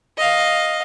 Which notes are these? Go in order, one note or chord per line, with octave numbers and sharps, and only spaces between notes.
D#5 F5